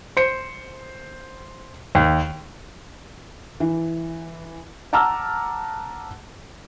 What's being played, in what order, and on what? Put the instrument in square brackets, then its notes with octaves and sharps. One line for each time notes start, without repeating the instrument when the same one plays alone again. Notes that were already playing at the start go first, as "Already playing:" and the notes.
[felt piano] C5 C#7
D#2
E3
F#5 A5 A#5 D6 E6 F6